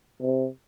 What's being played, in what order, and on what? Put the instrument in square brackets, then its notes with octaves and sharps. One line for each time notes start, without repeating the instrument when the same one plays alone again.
[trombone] C3